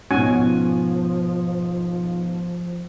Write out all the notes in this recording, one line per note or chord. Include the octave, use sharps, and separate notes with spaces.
G#2 B2 F3 C#4 F#4 G#5